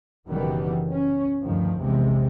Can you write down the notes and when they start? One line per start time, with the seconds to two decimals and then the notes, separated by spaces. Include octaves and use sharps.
0.28 F#1 B2 D#3 E3 G3 B3
0.91 C#4
1.43 D2 G2 D#3 F3
1.79 A#1 E2 C3 G#3